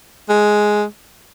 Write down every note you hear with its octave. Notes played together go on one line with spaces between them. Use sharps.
G#3